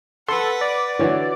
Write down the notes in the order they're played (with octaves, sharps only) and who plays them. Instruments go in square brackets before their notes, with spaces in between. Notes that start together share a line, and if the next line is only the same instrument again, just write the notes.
[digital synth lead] A4 [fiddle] B4 F#5 [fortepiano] C6
[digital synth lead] D5
[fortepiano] D3 E3 [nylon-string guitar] F#4 B4 C#5